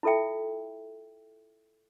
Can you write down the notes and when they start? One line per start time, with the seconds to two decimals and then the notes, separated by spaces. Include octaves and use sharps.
0.03 E4 F4 A4 E5 G5